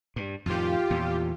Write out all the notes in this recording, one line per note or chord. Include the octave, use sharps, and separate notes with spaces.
G2
F2 A2 D#3 F4 G4
E2 A#2